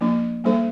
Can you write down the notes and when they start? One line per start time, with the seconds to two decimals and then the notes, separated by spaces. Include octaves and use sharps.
0.01 F3 A#3 D4
0.44 G3 A#3 D4 A4 C5